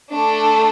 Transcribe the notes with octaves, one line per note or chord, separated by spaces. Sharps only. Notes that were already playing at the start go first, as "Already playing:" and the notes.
A3 D4 A4